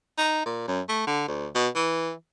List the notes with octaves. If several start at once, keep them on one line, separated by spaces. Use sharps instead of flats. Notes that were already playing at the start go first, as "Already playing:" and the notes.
D#4
A#2
F#2
A3
D3
D2
B2
E3